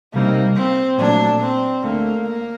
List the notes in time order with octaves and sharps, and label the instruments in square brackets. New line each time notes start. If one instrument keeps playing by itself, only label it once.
[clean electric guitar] C2 C3 G3 C4 D#4 [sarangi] A#3
[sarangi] C4
[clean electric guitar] A#2 F#3 A3 [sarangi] D4
[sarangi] C4
[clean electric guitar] D2 D3 A3 [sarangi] A#3
[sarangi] A#3